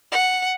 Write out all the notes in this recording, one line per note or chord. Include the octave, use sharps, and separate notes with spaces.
F#5